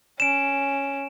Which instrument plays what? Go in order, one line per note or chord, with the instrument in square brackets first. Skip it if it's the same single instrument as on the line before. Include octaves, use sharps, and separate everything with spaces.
[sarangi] C#4 [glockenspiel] D7 E7